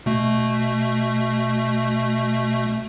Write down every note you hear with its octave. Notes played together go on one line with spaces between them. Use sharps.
B2 A3